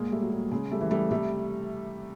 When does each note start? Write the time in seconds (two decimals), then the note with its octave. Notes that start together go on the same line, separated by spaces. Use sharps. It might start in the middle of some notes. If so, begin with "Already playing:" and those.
Already playing: A#2 G#3 A#3
0.12 G3 A3
0.22 F#3
0.32 G3
0.51 C#3 G#3
0.71 G3 A3
0.81 E3
0.91 G3 A3
1.11 C3 G3 A3